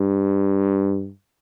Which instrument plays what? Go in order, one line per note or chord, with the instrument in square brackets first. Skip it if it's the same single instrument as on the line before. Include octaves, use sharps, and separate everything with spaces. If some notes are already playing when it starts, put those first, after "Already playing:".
Already playing: [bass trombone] G2